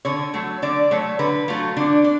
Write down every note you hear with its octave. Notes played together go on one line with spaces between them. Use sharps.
D3 C#5
F#3 A3
D3 D5
F#3 A3 C#5
D3 B4
F#3 A3 F4
D3 D4
D4